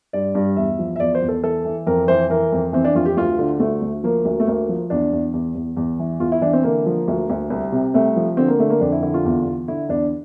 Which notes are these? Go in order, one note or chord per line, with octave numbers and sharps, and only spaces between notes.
G2 D5
G2
E2 E5
F3
E5
E2 D5
C5
E2
A4
E3 A4
E3
F2 A#4
E3 C5
E3 A#4
F2
E3 C4
D4
F2 F4
G4
D2 F4
D3
D2 A3
D2
F3 A#3
D2
A3
D2 A#3
F3
E2 D4
E2
E2
E2
E2
E3
E2 F4
E4
E3 D4
C4
D3 A#3
F3
D2
D2
C2
C3
C2 A3
F3
D3 C4
A#3
D3 A3
A#3
F2 D4
E4
D3 E4
F4
E2
E2
D3 E4
E2 D4